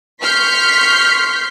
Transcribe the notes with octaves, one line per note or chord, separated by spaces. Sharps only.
C6 C#6 F6 G6 B6 C7